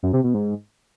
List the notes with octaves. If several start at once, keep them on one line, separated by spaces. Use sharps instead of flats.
F#2
C3
B2
G#2